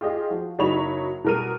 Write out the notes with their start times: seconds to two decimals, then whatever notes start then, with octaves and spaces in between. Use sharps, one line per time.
0.01 F4 G4 G#4 D#5
0.29 F3 F#4
0.58 F#1 F#3 D#4 C#5 B5 F7
1.24 B2 G3 A#4 F6 D#7